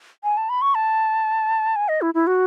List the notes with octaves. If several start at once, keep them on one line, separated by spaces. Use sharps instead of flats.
G#5
A5
B5
C#6
A5
G#5
D#5
E4
E4
F#4